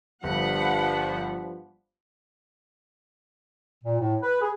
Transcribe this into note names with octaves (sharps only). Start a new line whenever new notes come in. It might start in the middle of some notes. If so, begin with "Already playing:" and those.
G1 G2 F3 F#5 B5
A#2
A2
B4
G#4